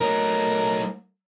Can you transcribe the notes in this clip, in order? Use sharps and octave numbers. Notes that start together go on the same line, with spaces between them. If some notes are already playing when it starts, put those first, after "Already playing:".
F#3 A3 D#4 A#4